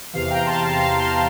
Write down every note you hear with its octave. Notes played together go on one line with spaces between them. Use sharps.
E2 C3 E3 F5
G5 A#5
A5 C6
F5 A5
F5 A5
A5 C6